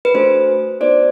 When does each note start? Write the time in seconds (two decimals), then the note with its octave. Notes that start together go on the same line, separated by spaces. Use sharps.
0.05 B4
0.14 A3 D4 F#4 A4 C5
0.81 B3 D#4 F#4 C5 D5